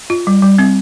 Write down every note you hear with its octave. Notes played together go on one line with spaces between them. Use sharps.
F4
G3
G3
C4